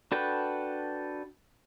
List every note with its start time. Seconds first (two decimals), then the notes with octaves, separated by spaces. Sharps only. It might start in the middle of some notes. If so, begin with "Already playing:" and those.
0.12 D4 F#4 A4 B4 G5